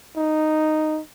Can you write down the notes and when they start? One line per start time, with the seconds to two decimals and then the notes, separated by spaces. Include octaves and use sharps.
0.16 D#4